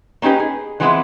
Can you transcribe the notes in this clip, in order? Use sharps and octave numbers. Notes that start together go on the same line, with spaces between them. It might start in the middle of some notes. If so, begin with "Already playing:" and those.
A#3 C#4 D#4 G4 B4
G#4
E3 F3 G#3 B3 C4 E4